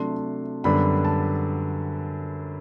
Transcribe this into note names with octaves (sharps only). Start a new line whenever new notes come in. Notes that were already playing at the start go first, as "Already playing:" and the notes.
Already playing: C3 F#3 A3 D4 C6
F#2 D3 G3 B3 D4 B5
A5